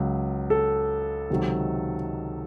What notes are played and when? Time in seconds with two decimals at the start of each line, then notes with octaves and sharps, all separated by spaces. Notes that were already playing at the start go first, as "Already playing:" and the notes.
Already playing: C#2 C#3 F#3
0.50 A4
1.30 C#2 C3 D#3 F#3